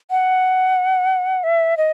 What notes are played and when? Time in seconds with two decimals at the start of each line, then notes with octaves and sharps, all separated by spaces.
0.11 F#5
1.44 E5
1.77 D#5